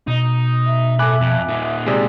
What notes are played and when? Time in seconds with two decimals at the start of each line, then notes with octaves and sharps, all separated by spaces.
0.08 B2 D#4
0.66 E5
0.99 A4 G#5 B5 D6 F#6
1.21 F2
1.48 A#2 D#4
1.86 C3 G#3 D5